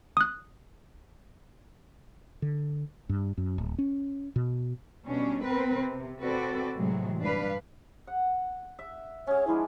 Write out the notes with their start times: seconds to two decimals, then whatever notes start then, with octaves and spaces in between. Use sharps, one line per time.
0.17 D#6 F#6
2.42 D3
3.09 G2
3.38 F#2
3.58 D1
3.78 C#4
4.36 B2
5.07 B2 G3 C#4 D4
5.45 B3 C4 A#4 B4
5.78 C3
6.22 C4 F#4 A4 B4 D5
6.78 A2 C3 E3 F#3 G#3
7.22 G2 D4 B4 F5
8.07 F#5
8.79 E5
9.27 C#4 G#4 C#5
9.47 F3 G#3 D4 E4